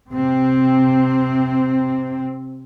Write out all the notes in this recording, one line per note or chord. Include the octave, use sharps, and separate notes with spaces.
C3 C4